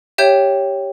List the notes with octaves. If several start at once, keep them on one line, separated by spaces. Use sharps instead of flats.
G4 C#5 E5 G5 G6